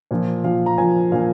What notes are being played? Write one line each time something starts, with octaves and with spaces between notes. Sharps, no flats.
A#2 F3
A#2 F3 F5
A#5
A#2 F3 G#5
A#2 F3 F5